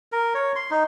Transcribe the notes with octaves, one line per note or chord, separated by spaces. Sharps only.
A#4
C#5
C6
D#4